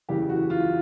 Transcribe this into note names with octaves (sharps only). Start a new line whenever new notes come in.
F#1 E2 C#3 E3 G4
F#4
F4